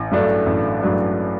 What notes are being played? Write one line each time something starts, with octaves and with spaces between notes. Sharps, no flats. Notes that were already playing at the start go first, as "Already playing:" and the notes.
Already playing: A1
G2 F#3 A3 D4
A1
G2 F#3 A3 D4